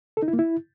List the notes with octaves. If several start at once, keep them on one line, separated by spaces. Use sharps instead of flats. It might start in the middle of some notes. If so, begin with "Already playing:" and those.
A4
D#4
E4
A#3
E4